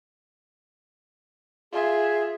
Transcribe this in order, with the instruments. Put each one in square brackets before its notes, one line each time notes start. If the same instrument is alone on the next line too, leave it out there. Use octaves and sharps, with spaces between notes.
[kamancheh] F4 E5 [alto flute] G#4